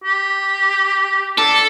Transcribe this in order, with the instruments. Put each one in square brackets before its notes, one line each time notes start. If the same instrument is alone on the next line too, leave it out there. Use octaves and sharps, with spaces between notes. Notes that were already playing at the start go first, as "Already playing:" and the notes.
[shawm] G4
[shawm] D4 [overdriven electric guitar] A4